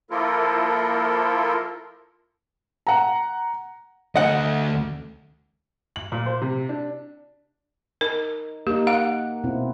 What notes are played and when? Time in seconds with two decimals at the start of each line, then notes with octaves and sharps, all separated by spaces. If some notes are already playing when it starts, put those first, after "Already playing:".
0.11 F3 A#3 E4 F4 A4 A#4
2.87 F#5 A#5
4.16 D2 D#5 F#5
5.96 F#7
6.12 A#2
6.26 C5
6.42 C3
6.69 D4
8.01 D#4 A#4
8.67 A#3 D#4 G4
8.87 F5 F#5
9.44 B2 C4 E4